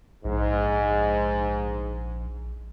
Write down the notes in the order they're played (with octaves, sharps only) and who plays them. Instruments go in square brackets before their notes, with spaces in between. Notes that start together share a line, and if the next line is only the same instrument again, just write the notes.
[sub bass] A#1 [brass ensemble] G#2